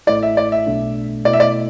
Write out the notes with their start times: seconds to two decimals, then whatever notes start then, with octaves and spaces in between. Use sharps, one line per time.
0.07 A1 A2 A3 E4 D5
0.23 E5
0.37 D5
0.52 E5
0.67 B1 B2 A3 D4
1.25 B2 A3 E4 D5
1.33 E5
1.40 D5